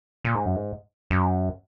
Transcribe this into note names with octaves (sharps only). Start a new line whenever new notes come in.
A#2
G#2
F#2
G#2
F#2